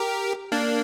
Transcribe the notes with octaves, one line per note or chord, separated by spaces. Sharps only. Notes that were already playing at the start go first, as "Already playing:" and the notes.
Already playing: G4 A#4
A#3 D4